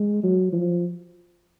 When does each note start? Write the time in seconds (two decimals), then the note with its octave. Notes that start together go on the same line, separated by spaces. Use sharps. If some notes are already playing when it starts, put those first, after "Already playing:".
Already playing: G#3
0.23 F#3
0.52 F3